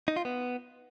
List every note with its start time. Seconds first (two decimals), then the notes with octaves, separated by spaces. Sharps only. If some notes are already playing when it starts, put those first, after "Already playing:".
0.08 D#4
0.16 F4
0.25 B3